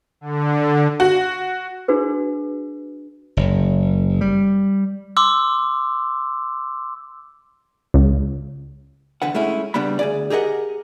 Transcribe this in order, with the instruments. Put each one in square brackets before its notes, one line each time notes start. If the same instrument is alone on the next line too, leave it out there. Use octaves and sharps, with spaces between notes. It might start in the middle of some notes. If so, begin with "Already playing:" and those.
[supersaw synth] D3
[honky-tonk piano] F#4
[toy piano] D4 F#4 G#4 B4
[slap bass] F#1
G3
[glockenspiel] C6 D6 E6
[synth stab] C#2
[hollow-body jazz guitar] E2 D3 B4 F#5
G#3 A3 C#4 E4
C#3 G3 B3 D4 B5
D2 G#4 D5
G4 G#4 A#4 D#5 F#5